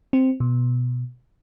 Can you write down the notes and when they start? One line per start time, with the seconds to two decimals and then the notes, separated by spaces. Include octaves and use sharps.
0.13 C4
0.40 B2